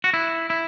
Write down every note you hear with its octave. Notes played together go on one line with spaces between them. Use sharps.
F#4
E4
E4